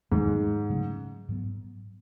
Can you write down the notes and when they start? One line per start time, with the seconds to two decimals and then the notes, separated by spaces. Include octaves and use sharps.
0.11 E2 G#2 D#3 G#3
0.70 C#3 F#3 A3 C#4
1.29 G#2 F#3 B3